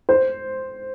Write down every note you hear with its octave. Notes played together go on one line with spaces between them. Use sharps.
C5